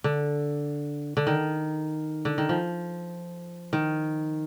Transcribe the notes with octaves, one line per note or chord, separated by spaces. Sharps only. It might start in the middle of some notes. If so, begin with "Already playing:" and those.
D3
D3
D#3
D3
D#3
F3
D#3